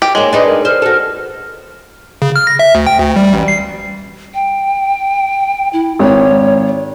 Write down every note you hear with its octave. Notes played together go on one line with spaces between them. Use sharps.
G4
G#2 G#3 A#3 C#5
D4 D#4 B4 D#5
A#4
C5 F6
F#4 A4
C#3
F6
A#6
E5
D2
G5
D2
G3
A1
C7
G5
E4
G#1 C#5